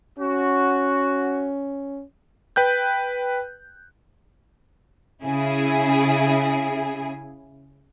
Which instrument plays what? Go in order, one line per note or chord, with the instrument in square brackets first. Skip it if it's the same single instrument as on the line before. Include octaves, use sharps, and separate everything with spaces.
[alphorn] C#4 [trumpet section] F#4
[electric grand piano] B4 G5 F#6 G6
[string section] C#3 E4 G#4